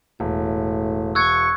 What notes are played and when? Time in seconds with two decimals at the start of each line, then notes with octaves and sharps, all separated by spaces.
0.20 E1 A2
1.15 C#6 E6 F#6 G#6